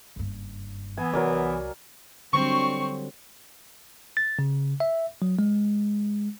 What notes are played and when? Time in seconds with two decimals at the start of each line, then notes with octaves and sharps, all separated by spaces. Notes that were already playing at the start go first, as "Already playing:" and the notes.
0.16 F#1 G2
0.97 E3 B3 G#5
1.13 C2 F#3 A#4 D5
2.33 D3 F#3 G3 C4 C#6
4.17 A6
4.39 C#3
4.80 E5
5.22 F#3
5.39 G#3